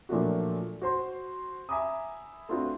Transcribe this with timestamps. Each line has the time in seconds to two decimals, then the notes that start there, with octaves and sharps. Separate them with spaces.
0.09 A#2 F3 F#3 A3 D4 F#4
0.82 F#4 C5 C6
1.69 E5 G#5 A#5 B5 D6 D#6
2.49 A3 C4 D4 F4 F#4 B4